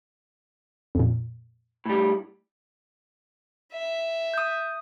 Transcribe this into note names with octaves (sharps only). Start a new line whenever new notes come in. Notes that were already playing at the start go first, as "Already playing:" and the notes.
F2 A#2
A2 G3
E5
D#6 G6